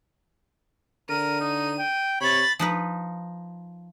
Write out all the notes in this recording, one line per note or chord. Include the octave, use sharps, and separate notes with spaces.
D3 A#4 D#7
D#4
G5
C3 C#5 B5 A6
F3 D#4 B4